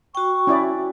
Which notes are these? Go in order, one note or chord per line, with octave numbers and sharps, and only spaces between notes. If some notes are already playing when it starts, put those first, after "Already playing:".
F#4 G5 C#6
C#4 E4 D5